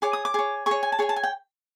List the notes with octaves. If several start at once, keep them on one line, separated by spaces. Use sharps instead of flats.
G#4 C#5 D6
D#6
D6
G#4 C#5
G#4 C#5 C#6
G#5
A5
G#4 C#5 G#5
A5
G#5
G5